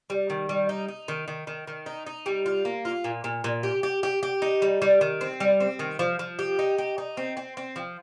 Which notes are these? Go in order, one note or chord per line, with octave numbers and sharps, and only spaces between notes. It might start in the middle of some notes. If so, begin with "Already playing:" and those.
G3
D#3
G3
D#4
D#4
D#3
D#3
D#3
D#3
D#4
D#4
G3
F4
A#3
F4
A#2
A#2
A#2
G4
G4
G4
G4
D#4
G3
G3
D#3
C4
G3
C4
D#3
F3
F3
G4
D#4
G4
D#4
C4
C4
C4
F3